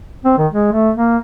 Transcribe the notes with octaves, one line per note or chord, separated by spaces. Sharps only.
C4
D#3
G#3
A3
A#3